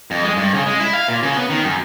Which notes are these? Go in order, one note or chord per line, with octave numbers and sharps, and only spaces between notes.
F2
G#3
G2
C#3
G#3
E4
F5
A#2
C#3
B3
D#3
F#2